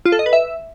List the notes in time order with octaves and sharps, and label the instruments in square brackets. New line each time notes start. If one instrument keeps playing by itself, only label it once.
[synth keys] F4
A4
D#5
B4
E5